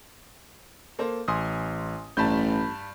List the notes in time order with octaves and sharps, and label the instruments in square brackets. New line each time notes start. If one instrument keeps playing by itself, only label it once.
[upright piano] A#3 A4 C5
[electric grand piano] A1 [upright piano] G#5 C6 D#6
[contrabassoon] A1 [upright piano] G2 A5 [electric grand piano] B5 G6